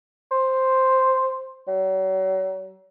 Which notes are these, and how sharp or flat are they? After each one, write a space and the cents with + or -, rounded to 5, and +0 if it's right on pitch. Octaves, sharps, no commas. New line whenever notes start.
C5 +0
F#3 +40